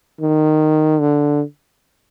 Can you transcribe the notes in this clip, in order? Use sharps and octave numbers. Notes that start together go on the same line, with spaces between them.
D#3
D3